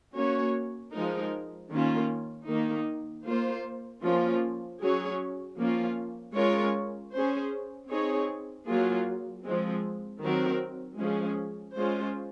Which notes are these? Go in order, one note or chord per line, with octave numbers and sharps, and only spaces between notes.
A#3 C#4 F#4 C#5
F3 G#3 D#4 A#4
D#3 A#3 C#4 F4
D#3 A#3 D#4
A#3 F4 C5
F3 A#3 C#4 F4
F#3 C#4 G#4 C#5
F3 A#3 C#4 F4
G#3 C#4 F4 A#4 C#5
C#4 G#4 C5
C4 D#4 G#4 C#5
F#3 A#3 F4 G#4
F3 G#3 C4
D#3 F#3 C4 F#4 A#4
F3 G#3 C#4 G#4
G#3 C#4 F4 C5